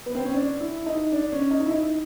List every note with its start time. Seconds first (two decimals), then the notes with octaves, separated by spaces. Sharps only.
0.06 B3
0.15 C4
0.25 C#4
0.34 D4
0.60 E4
0.86 D#4
1.12 D4
1.32 C#4
1.51 D#4
1.66 E4
1.71 D#4